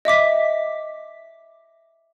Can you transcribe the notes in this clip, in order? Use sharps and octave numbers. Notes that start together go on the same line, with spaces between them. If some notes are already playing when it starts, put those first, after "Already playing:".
D#5 E5 D6 B6